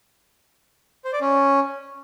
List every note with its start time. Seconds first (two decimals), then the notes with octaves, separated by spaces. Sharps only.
1.05 C5
1.13 D5
1.21 C#4